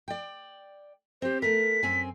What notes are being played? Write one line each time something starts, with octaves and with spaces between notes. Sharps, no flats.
D5 G5
C4 G4 C5
A3 A#4 B6
F#2 C4 G#5